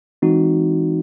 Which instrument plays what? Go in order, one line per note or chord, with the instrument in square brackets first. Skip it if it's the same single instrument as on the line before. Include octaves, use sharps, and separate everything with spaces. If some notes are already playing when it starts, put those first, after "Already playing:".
[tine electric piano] E3 G#3 C4 D#4 F#4